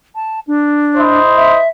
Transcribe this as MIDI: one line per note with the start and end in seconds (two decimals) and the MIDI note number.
0.15 0.40 81
0.47 1.19 62
0.96 1.60 64
0.96 1.60 72
0.96 1.60 75
1.37 1.68 76